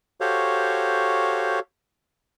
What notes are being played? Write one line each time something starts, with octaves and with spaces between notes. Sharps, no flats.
F#4 G4 A4 C5 C#5 F5